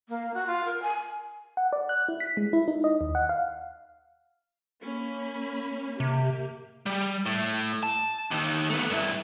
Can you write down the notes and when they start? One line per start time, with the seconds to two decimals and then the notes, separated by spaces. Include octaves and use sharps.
0.09 A#3
0.34 F#4
0.46 F4
0.65 A#4
0.82 G#5
1.57 F#5
1.73 D5
1.89 F#6
2.08 E4
2.20 B6
2.37 G#3
2.53 E4
2.68 D#4
2.84 D#5
3.01 D#2
3.15 F#5
3.29 F5
4.82 A#3 C#4 B5
6.00 C3 A#3 G4
6.86 G3
7.26 A2
7.83 A5
8.31 D#2 D#3
8.70 A3 B3
8.90 G2 E4